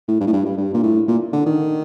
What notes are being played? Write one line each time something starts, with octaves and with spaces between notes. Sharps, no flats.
A2
G2
A2
G2
G2
G2
A#2
A2
A#2
D3
D#3